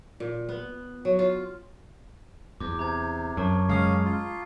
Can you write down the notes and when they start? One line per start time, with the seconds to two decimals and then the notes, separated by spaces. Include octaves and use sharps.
0.20 A#2
0.49 B3
1.05 F#3
1.19 F4
2.60 E2 D6
2.79 C3 A#5 G6 G#6
3.37 F#2 A5 C#6
3.69 C#3 G#3 C#4 F5 D#6 C7
4.05 F4